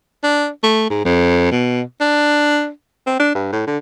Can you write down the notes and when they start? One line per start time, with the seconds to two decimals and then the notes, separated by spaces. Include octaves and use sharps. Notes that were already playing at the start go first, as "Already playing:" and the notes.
0.23 D4
0.63 A3
0.90 G#2
1.05 F2
1.51 B2
2.00 D4
3.07 C4
3.19 D4
3.35 G2
3.52 A2
3.67 D3